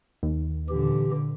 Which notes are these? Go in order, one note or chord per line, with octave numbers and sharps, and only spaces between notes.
D#2
A#2 D3 E3 G4